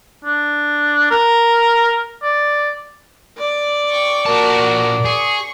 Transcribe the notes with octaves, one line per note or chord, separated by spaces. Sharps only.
D4
A#4
D5
D5
G5 C#6
A#2 F#4 A#4 A5
G#4 C#6